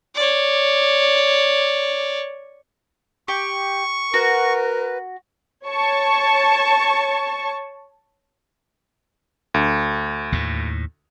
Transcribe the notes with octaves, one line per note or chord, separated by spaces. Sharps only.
C#5 D5
G4 C#6
F#4 A#4 B4
C#5 A5 C#6
D2
D#2 A2